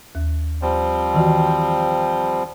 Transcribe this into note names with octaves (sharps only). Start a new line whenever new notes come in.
D#2
F3 G3 C4
D#3 E3 F#4